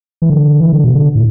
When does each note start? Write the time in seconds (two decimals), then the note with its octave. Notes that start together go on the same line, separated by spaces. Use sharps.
0.22 E3
0.30 D3
0.60 E3
0.73 D3
0.84 B2
0.95 D3
1.15 A2